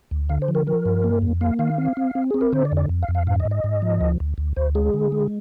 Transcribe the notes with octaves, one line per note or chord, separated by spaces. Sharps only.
D2
D3 F5
C5
F3
A#4
F3 A#4
G2
A#3
F2
A#3 F5
D#3 F5
C4
C4
C4
C4 G#4
A#4
D3 C5
D5
F2
D5
F2
F5
F2
F5
G#2 F5
D#5
G#2
D#5
G#2
F3
D2
D2
D2
D2 C5
G#3 G#4
D3
G#3